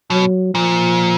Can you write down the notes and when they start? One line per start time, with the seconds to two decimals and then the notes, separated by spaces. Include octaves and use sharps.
0.10 B2 F#3
0.54 A#2 F3